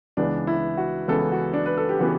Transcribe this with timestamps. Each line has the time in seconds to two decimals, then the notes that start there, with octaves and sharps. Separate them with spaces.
0.17 C#2 C#3 E3 B3 D4
0.47 E4
0.77 F#4
1.08 C#2 C#3 E3 B3 A4
1.32 F#4
1.53 D4
1.66 B4
1.77 A4
1.89 G4
1.99 C#3 E3 B3 F#4